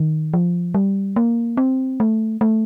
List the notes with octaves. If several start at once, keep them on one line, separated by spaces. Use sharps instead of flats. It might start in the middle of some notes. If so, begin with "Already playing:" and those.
Already playing: D#3
F3
G3
A#3
C4
A3
A3